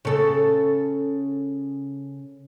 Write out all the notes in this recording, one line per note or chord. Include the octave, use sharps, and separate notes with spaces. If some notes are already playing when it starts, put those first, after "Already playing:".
C#3 A4